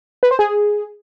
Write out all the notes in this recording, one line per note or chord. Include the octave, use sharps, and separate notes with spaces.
B4
C5
G#4